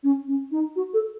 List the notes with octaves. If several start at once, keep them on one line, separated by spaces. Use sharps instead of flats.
C#4
C#4
D#4
F#4
A4